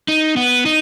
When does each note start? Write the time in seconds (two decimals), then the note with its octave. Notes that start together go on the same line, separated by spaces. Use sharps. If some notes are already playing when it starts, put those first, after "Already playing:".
0.08 D#4
0.37 B3
0.66 D#4